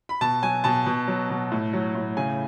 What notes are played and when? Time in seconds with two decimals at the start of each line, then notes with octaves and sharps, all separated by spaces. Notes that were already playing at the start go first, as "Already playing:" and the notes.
0.09 B5
0.21 B2 A5
0.42 F#3 G#5
0.64 B2 A5
0.86 B2
1.08 F#3
1.30 B2
1.51 A2
1.73 F#3
1.95 A2
2.17 C#3 G#5